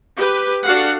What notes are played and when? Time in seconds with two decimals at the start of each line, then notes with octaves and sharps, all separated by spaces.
0.16 G4 B4
0.64 D4 F#4 A4 F5 F#5